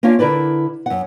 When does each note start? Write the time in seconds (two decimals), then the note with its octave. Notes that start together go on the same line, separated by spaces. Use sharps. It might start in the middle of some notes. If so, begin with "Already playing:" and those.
0.03 A#3 C#4 D4 F4 F5
0.19 D3 E4 A#4 B4 D5
0.86 F#2 F#5